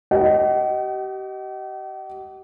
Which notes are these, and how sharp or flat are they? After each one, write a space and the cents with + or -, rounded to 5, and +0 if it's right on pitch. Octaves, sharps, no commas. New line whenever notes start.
G4 -35 D#5 +0 F#5 +45